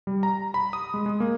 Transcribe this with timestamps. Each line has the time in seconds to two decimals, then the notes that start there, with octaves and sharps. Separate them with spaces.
0.07 G3
0.23 A#5
0.54 B5
0.73 D#6
0.94 G#3
1.06 G#3
1.20 A#3